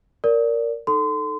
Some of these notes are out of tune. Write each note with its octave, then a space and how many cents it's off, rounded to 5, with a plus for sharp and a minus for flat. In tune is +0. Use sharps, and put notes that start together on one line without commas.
A#4 +0 D5 -20
D#4 +0 A4 +0 C6 -30